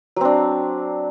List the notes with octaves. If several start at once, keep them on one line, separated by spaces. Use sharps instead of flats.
F#3 C4 D4